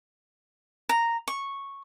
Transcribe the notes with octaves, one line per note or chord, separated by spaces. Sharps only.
A#5
C#6